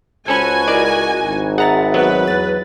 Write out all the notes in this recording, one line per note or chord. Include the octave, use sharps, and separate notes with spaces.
C#2 C#4 F#4 A4 C5 G#5 B5
E4 A#4 D5 D#5
G#1
G#4 E5 F#5 A#5 A6
F#3 B3 B4
E2 A6